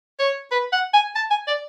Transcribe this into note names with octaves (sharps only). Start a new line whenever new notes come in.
C#5
B4
F#5
G#5
A5
G#5
D5